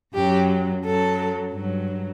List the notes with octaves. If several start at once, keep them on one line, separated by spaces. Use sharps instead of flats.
F#2 F#3 G4
F#2 F#3 A4
G2 F#3